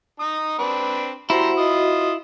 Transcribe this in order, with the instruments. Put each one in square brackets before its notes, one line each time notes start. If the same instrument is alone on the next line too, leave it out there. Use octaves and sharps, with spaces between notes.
[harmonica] D#4 D#6
C4 D4 B4
[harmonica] G3 A#5 C6 [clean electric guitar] E4 [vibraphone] F#4 C5 F#5
[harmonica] F4 D#6 [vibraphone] F#4 D#5